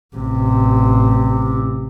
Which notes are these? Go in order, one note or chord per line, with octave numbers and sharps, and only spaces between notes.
A1 C3